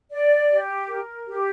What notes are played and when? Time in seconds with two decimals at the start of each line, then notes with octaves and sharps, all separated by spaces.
0.11 D5
0.50 G4
0.88 A#4
1.27 G4